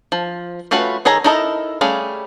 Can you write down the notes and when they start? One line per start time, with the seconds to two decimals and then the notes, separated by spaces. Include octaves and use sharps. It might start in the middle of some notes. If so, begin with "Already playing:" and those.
0.12 F3
0.71 A3 C#4 F4 F#4 B4
1.05 D#3 G#4 A4 C#5 A#5
1.24 D#4 E4 A4 A#4 D#5
1.81 G3 A3 C#4 G#4 F5